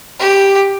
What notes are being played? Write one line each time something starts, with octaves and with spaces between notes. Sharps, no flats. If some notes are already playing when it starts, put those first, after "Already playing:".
G4